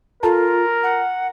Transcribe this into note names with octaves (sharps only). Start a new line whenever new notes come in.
F4 A4 A#4 A5 A#5
F#5